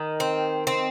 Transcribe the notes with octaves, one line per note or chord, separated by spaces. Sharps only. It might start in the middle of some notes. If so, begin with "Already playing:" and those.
Already playing: D#3
C4
C4